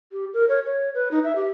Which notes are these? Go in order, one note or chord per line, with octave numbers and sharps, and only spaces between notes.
G4
A#4
C#5
C#5
B4
D#4
E5
G4